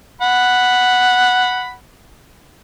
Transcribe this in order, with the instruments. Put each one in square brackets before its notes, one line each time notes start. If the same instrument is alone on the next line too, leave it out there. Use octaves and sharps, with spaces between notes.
[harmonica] F#5 B5